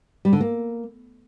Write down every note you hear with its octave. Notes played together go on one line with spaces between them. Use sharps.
G3
D3
A#3